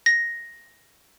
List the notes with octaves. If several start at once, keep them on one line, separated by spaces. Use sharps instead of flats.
A#6